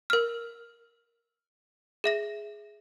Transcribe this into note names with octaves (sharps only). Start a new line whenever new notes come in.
A#4 F6
G#4 E5 A#6